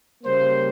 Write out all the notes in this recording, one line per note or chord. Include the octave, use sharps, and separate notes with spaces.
C#3 G3 A#3 C5